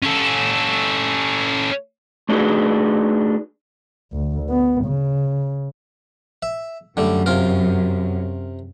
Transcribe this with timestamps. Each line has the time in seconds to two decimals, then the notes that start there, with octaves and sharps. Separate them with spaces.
0.03 C#4 A4
2.29 A3 D4 D#4 F#4 G#4 B4
4.13 D2
4.50 B3
4.85 C#3
6.42 E5
6.97 F#2 D3 G3 A3
7.26 C3 F4 A#4